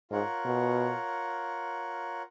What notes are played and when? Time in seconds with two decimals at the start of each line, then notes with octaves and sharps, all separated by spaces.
0.11 G#2 F4 A#4 C#5 F#5
0.45 B2